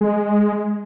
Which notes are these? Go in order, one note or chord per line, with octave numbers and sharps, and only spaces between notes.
G#3